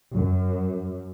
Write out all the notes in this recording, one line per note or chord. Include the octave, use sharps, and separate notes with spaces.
F#2